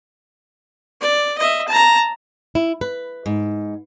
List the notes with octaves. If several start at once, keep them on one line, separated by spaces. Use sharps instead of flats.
D5
D#5 E5
A5 A#5
E4
B4
G#2